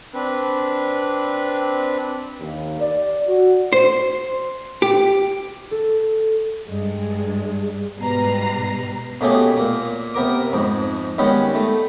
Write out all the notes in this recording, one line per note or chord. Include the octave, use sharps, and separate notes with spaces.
C4 D4 B4
D#2
D5
F#4
C5
G4
A4
G2 G#3
G#2 B2 G3 B4 A#5 C7
B2 A3 A#3 C#4 G4 G#4
A#2 A#3
C3 B3 A#4 D6
F2 G#2
D#3 G3 G#3 B3 C#4 B4
A3